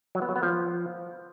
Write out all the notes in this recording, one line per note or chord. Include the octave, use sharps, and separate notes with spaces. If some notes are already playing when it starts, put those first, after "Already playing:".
F#3
B3
F#3
B3
F3